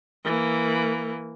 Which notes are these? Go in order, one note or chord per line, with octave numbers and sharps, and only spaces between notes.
E3 A#3